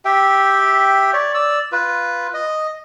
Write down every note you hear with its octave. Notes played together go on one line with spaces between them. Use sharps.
G4 E5 G5
C#5 D5
D5 E6
F4 B4
D#5